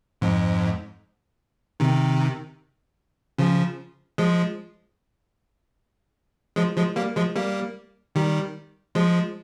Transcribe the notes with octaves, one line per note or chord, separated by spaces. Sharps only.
F2 G#2
C3 D#3
C#3 F3
F3 G#3
F3 G#3
F3 G#3
G3 A#3
F3 G#3
G3 A#3
D#3 G3
F3 G#3